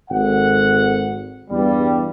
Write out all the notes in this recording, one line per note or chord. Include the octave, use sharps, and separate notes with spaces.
G#1 A4 F#5
E2 G2 G3